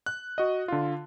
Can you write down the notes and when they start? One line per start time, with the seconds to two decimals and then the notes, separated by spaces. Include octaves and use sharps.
0.06 F#6
0.38 F#4 D#5
0.68 D3 F4